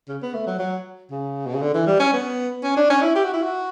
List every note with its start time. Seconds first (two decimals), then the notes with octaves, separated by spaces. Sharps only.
0.08 C#3
0.22 B3
0.34 A3
0.47 F#3
0.59 F#3
1.11 C#3
1.46 B2
1.55 C#3
1.61 D3
1.74 E3
1.87 G3
1.99 C#4
2.13 B3
2.64 C#4
2.77 D4
2.90 C#4
3.01 E4
3.15 G4
3.24 F#4
3.33 E4
3.42 F#4